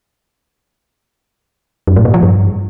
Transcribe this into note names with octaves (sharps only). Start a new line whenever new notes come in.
F#2
A2
A#2
F3
G2